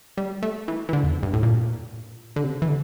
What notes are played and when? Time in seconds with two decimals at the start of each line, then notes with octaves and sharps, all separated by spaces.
0.17 G3
0.43 A3
0.68 E3
0.89 E3
0.93 D3
1.04 E2
1.14 F2
1.23 G2
1.33 A2
1.43 A#2
2.36 D3
2.44 C3
2.62 E3
2.68 D3